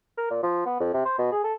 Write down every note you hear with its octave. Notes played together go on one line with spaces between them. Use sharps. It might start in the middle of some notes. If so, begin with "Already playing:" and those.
A#4
A#2
F3
B3
F2
C3
C5
B2
G#4
A4